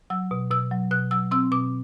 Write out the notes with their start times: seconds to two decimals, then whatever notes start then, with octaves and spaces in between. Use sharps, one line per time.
0.10 F#3 E6
0.31 B2
0.51 B2 E6
0.71 F#3
0.91 B2 F#6
1.11 F#3 E6
1.31 C4 E6
1.51 B2 D6